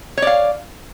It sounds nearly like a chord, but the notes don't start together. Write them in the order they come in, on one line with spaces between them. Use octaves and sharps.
C#5 D5 F5